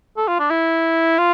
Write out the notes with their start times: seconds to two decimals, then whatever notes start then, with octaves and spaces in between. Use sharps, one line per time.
0.17 A4
0.28 F4
0.39 D4
0.50 E4
1.18 F4